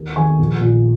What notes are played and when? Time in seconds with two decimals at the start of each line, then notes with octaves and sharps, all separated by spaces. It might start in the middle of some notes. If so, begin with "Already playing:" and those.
Already playing: D#2
0.16 D#3 G#5 C#6
0.39 A#1
0.61 A#2